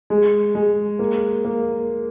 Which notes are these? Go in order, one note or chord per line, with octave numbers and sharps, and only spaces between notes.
G#3
G#3
A#3
A#3